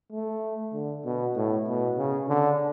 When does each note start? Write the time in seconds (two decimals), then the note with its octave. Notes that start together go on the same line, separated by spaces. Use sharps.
0.12 A3
0.73 D3
1.05 B2
1.36 A2
1.67 B2
1.98 C#3
2.29 D3